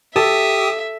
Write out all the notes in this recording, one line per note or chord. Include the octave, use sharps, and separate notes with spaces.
G4 A4 E5 D#6